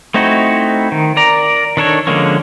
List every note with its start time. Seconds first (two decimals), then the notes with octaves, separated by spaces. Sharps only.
0.14 A3 C4 D#4 E4 F#4
0.92 D#3
1.17 A#4 D5 A#5
1.77 D#3 D4 A4 C#5
2.07 D3 F3 G#3 A#3 C#4